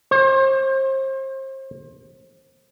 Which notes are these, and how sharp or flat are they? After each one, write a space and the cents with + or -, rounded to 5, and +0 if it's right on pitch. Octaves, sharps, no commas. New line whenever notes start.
C5 +35